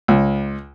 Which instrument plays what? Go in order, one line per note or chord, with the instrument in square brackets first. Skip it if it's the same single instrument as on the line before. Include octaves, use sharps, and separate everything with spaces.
[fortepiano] C#2